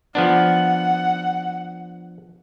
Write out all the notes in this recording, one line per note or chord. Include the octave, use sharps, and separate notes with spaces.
F3 B3 D4 F#5